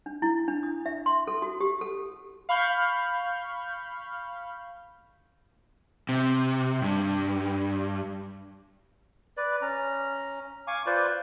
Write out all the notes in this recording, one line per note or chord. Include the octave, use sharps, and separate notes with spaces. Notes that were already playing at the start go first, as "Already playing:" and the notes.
D4
E4
D4
D#6
E5
C6
A4
F#4
G4
A4
F5 B5 C#6 F6 G6
C3
G2
B4 D5
C#4 A#5
F5 G#5 C#6 D6
F4 B4 C5 D5